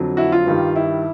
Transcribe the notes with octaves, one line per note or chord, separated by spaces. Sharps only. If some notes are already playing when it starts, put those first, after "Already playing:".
Already playing: F2 D3 F#3
E4 F#4
F4
G2 D#3 G3
E4